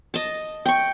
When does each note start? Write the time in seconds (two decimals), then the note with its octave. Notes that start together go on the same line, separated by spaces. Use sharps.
0.14 D#5 A5
0.66 G5 C#6